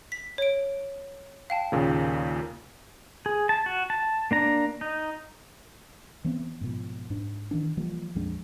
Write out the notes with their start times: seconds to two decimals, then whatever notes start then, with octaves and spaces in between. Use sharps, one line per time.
0.12 B6
0.38 C#5 D7
1.50 F5 G5 A5
1.72 D#2 A#2 C#3
3.26 G#4
3.49 A5
3.66 F#4
3.90 A5
4.31 A#3 D4 A#5
4.81 D#4
6.24 E3 B3 C4
6.61 G#2 B2 F3
7.10 G#2 D4
7.51 D#3 E3 D4
7.77 E3 F3 G3 A#3
8.15 A#1 F2 G#3 D4